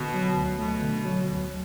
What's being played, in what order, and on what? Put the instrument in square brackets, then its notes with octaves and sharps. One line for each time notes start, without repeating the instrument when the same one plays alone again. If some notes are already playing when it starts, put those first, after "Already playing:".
Already playing: [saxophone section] B2 [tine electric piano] D3
[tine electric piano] F#3
D2
[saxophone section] B2 [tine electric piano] A3
[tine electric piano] D3
F#3
D2